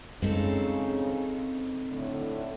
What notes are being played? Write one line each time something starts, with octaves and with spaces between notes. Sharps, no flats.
F#2 C#3 G#3 C4 D#4 A4
A2 D3